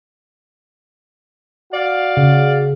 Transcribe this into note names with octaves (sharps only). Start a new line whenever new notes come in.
F#4 D5 F5
C#3